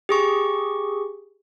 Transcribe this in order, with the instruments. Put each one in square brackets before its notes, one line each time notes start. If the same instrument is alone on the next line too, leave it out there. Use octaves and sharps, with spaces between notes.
[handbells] G4 G#4 C#6